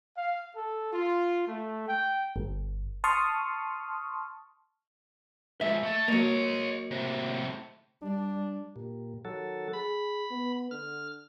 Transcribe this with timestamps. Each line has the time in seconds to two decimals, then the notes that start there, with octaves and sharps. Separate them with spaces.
0.16 F5
0.54 A4
0.92 F4
1.46 A3
1.86 G5
2.36 G1
3.04 A5 C6 C#6 D#6 F6
5.61 F3 G#3 E5
5.83 A3 A4
6.08 F#3 A#3 C#5 D#5
6.91 A2 C3
8.03 G3 D4
8.76 A#2 G4
9.25 D#3 F#3 A4
9.73 G#4 B5
10.31 B3
10.71 D3 F6